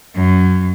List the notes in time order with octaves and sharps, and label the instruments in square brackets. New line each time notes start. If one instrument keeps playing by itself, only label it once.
[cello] F#2